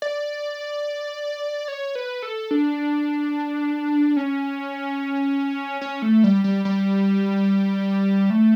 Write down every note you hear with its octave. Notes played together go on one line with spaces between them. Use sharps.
D5
C#5
B4
A4
D4
C#4
C#4
A3
G3
G3
G3
A3